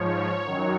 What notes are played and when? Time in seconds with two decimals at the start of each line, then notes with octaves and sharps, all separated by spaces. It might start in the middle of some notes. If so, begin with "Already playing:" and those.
Already playing: G#2 F3 C#5
0.44 F#2 D#3 F#3